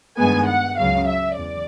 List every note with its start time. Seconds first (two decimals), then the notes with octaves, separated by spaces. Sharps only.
0.17 G2 D#3 G#3 B3 G#5
0.47 F#5
0.77 C#2 C#3 F#3 F5
1.07 E5
1.37 E2 D5